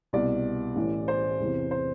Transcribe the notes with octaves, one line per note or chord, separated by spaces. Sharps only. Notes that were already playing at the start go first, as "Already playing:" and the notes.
C2 B2 D5
A1 A2 E3
C5
E2 C3 E3
C5